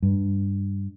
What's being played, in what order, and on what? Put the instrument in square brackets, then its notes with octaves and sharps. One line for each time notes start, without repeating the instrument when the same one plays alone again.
[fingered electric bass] G2